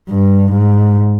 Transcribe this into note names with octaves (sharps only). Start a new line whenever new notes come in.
G2
G#2